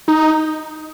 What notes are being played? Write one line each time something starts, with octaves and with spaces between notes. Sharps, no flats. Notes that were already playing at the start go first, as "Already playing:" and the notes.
D#4